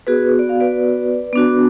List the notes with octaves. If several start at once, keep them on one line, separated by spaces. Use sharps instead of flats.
B3 F#4 G#4 B4
D5
F5
B4 D5
B3 D4 F#4